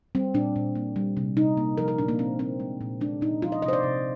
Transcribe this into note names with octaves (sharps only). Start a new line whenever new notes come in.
G3 C4
A#2 D4
A#2
A#3
G3
C3
C3 D#4
A#3
F3 A#4
A#4
A#2 D4
A#3
A#2 C4
A#3 C4
G#3
A#2
G#3 D4
A#2 D#4
F3 F4
D#5
C3 D#5
C5
D5
C3